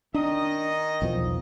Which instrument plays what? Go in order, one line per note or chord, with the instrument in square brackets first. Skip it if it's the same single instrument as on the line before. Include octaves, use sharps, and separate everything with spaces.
[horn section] D#3 D#5 [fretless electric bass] D4
[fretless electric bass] B1 E2 F3